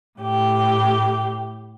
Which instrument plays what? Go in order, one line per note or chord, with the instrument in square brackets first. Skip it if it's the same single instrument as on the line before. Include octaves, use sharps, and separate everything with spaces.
[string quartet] A2 G4